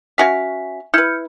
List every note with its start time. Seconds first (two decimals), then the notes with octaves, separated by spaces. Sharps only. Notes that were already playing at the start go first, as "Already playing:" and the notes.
0.18 C#4 F#4 E5 F5 G#5 B6
0.94 E4 B4 F6 G6 C#7